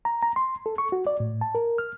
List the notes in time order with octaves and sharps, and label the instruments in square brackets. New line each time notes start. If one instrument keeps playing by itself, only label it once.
[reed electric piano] A#5
A#5
C6
A4
C#6
F#4
D5
A2
A5
A#4
F6